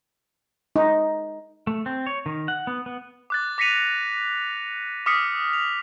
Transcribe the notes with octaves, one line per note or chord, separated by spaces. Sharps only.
D#4
A3
C4
C#5
D#3
F#5
B3
B3
D6 F#6 A6
D6 A#6 B6 C#7 D#7 F7
D6 D#6 F6 B6 C#7
F7